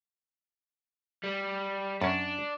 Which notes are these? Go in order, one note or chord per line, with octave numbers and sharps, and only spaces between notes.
G3
F#2 C#4 D4